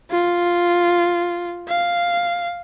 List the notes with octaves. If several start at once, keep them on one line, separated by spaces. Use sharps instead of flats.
F4
F5